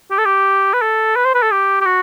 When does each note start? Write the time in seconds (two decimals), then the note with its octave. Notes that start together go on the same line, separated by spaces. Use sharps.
0.11 G4
0.18 A4
0.26 G4
0.74 B4
0.82 A4
1.16 B4
1.25 C5
1.35 B4
1.43 A4
1.51 G4
1.81 G4
1.86 F#4